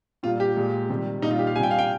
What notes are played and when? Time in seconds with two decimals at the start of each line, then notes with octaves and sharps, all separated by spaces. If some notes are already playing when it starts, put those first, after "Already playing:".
0.23 A#2 G3 F4
0.40 G4
0.56 A#2 G#3
0.89 C3 D#3 G3
1.22 A#2 G3 D#4
1.31 F4
1.39 G4
1.47 F5
1.55 G3 G#5
1.59 C3 G5
1.71 F5
1.79 G5